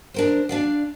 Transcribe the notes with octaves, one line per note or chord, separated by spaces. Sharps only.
D4 A#4 C5
D4 D5 F5